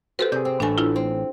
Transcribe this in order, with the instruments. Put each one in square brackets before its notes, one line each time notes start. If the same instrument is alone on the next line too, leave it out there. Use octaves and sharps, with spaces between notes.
[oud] C4 F#4 [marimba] G4 A4 B4
[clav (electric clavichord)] C3 G#4 [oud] D5 [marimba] G6
[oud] C4
[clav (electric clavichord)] A1 [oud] E3 A3 [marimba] D4 G#5
[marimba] D4 E4 F4
[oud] C4